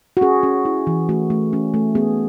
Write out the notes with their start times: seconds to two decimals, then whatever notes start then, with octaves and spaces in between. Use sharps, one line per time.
0.17 F#4
0.21 C#4 G#4
0.43 C#4
0.65 E4
0.87 E3
1.09 A3 F#4
1.30 A3
1.53 C#4
1.74 A3
1.95 B3 G#4